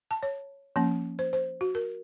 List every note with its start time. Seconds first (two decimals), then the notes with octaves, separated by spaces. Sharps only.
0.11 A5
0.23 C#5
0.76 F3 A#3 C#4
1.19 C5
1.33 C5
1.61 F#4
1.75 A#4